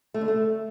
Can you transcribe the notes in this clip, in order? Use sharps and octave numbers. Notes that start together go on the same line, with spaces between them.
A3
D3
A3